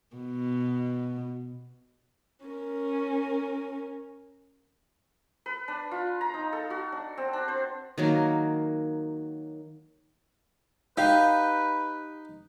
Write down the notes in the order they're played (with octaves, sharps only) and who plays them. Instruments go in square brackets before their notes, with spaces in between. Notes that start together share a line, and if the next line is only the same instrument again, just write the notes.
[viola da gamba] B2
[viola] C#4 A#4
[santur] B4
D4
F4
A#5
D#4
A4
F#4
D4
C4
D4
C5
[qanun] D#3 F#3 A#3
[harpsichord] D#4 [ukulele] G4 F5 [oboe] B4